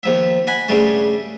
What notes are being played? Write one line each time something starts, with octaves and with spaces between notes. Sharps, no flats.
D#2 F3 E5
D#5 F#5 G#5 B5
G2 C#3 G3 A3